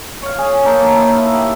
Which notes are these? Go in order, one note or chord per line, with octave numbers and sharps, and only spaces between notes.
C#5 F5
G#4
A#3 D#4 A4
D#4 E4
G4